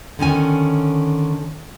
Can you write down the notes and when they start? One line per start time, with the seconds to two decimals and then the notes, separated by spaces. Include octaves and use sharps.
0.19 D3 D#3 C#4 G#5